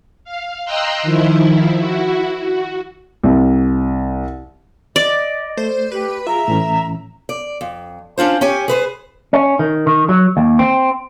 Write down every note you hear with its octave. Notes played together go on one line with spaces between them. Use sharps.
F5
D#5 G5 A#5 C6 E6 F#6
D#3 F3 E4
E4 F#4
F#4
C2
D5 D#5
A3 C5
G4 B4
F4 G#4 E5 A#5
A2 E3 C#4
D5
F2
C#4 D4 F4 C5
C#4 G4 C#5 G#5
G#4 B4 C5
C#4
D#3
D#3
F#3
D#2
C4